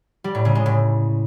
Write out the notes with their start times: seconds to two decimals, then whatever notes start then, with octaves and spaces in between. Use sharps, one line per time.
0.24 G3
0.35 A2
0.45 C#3
0.55 G#3
0.66 A2